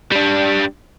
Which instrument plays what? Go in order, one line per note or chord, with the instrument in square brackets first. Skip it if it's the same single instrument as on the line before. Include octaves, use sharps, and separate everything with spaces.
[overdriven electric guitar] G3 D4